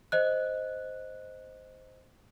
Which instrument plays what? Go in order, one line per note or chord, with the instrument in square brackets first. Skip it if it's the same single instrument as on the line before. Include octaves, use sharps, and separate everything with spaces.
[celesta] C5 D#5 F#6